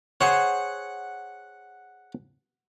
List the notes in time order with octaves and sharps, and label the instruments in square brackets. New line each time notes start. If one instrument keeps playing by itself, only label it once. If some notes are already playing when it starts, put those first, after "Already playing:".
[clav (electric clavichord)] G#4 C5 C#5 [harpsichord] F#5